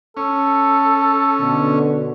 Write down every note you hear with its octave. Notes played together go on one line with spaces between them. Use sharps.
C#4 A4
B2 D3